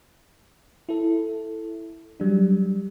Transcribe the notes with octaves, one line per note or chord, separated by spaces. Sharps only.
E4 A4
F#3 G3 D4